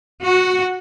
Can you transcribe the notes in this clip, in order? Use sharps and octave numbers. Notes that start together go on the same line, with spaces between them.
F#4